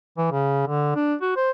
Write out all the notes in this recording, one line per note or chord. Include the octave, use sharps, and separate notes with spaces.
E3
C#3
D3
D4
F#4
C5